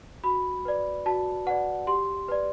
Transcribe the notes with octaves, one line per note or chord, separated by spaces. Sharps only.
F#4 B5
B4 D5
F#4 A5
B4 D5 F#5
G4 C6
B4 D5